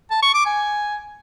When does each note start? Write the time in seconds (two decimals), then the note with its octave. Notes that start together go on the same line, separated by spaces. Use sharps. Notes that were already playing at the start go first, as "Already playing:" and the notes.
0.11 A5
0.22 C#6
0.34 D6
0.46 G#5